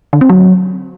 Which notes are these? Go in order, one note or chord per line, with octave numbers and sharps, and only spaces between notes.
D3
C4
F#3